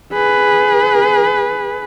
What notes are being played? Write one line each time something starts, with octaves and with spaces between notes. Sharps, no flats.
G#4 B4